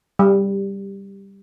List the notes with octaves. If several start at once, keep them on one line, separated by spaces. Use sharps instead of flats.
G3